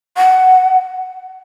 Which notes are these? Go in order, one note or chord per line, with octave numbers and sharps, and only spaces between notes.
F#5